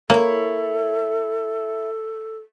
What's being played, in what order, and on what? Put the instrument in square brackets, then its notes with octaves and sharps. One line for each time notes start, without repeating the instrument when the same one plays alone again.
[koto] A#3 [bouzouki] E4 C#5 [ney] A4